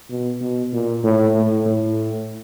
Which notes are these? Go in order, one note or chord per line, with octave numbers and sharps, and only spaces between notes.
B2
B2
A#2
A2
A2
A2